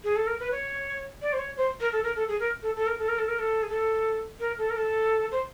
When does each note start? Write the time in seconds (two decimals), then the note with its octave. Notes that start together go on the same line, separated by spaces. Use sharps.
0.04 G#4
0.16 A4
0.27 A#4
0.40 B4
0.52 C#5
1.22 D5
1.33 C5
1.39 C#5
1.57 C5
1.81 A#4
1.92 A4
2.04 A#4
2.16 A4
2.28 G#4
2.40 A#4
2.63 A4
2.76 A4
2.87 A#4
2.99 A4
3.09 A#4
3.19 A4
3.28 A#4
3.39 A4
3.63 G#4
3.69 A4
4.40 A#4
4.58 A4
4.70 A#4
4.76 A4
5.32 C5